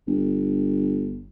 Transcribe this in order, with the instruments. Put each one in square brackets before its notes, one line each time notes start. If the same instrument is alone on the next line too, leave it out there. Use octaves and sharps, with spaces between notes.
[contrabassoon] G1